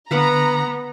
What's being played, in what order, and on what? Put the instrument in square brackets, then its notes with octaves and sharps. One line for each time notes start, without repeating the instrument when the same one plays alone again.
[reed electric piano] D3 [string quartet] B3 [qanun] B4 F5 F#5 [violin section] A#5